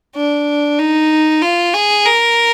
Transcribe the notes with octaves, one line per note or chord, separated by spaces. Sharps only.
D4
D#4
F4
G#4
A#4